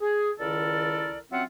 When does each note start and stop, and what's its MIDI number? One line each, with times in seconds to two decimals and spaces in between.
0.01 0.31 68
0.39 1.19 37
0.39 1.19 51
0.39 1.19 64
0.39 1.19 69
0.39 1.19 70
0.39 1.19 74
1.32 1.44 54
1.32 1.44 60
1.32 1.44 61
1.32 1.44 65
1.32 1.44 76
1.32 1.44 78